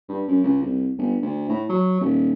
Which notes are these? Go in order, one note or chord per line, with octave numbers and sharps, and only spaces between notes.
G2
F#2
C#2
C2
G1
D2
A2
F#3
D#1